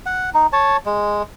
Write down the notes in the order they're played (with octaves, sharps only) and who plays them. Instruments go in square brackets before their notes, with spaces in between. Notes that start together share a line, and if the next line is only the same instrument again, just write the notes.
[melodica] F#5
D#4
C#5 A5
G#3